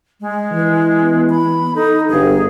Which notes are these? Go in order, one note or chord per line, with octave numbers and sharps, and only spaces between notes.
G#3
E3
B3
B5
D#4 A4
G1 G#4